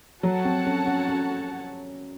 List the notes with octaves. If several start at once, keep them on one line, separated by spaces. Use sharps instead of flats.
F#3 F#4 A4 C#5 F#5 A5
C4
C#4
C#4
C#4